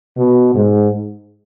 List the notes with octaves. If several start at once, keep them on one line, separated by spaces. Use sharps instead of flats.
B2
G#2